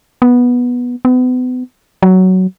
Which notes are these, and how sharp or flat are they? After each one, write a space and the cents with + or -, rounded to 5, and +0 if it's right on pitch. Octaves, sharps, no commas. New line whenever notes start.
B3 -10
B3 +35
F#3 +10